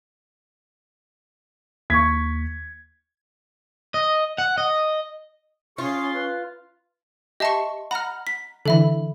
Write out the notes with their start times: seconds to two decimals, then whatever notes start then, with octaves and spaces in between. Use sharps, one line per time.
1.90 D#2 C#6 G#6 B6
3.94 D#5
4.38 F#5
4.58 D#5
5.78 C#4 F4 G#4 C6
6.14 B4
7.40 G4 D#5 E5 A5 C6 C#6
7.91 F#5 A#5 B5 F6
8.27 B6
8.66 D3 E3 A4 E5 B5